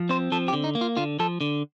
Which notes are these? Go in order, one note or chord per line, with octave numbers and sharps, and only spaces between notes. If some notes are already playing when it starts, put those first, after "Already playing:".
Already playing: F3
C4 C5
F3 A4
G4
D3
D#4
A#3
F4
D3 F4
F3 A4
D3